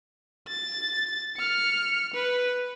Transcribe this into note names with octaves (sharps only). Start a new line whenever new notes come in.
A6
F6 C#7
B4